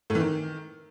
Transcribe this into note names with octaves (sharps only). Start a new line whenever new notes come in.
A2
E3
D#3